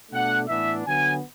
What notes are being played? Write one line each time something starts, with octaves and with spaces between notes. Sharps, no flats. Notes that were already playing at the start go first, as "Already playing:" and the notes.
B2 A3 D4 F#5
A2 E3 B3 D4 E5
D3 F#3 B3 G#5